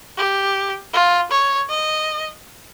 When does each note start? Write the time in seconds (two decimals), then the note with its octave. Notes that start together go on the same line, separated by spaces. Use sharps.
0.17 G4
0.93 F4
1.31 C#5
1.69 D#5